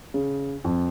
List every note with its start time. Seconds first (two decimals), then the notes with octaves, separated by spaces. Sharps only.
0.14 C#3
0.64 F2